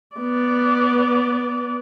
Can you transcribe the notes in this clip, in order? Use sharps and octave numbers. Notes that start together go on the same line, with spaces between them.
B3 D5